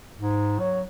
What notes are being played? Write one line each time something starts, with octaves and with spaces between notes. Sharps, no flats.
G#2
F#3